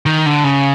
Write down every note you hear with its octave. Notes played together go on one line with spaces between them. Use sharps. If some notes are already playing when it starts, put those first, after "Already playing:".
D#3
D3
C#3